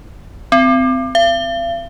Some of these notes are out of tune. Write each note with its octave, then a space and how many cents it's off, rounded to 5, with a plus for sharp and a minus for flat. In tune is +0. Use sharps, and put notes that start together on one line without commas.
C4 -25
F5 -45